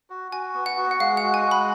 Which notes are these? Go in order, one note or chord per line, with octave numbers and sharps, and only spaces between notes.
F#4
F#4 G#5
B3
F#5
F#4
F#5
G#3 F5
F#5
F#4
G#5
G#3
B5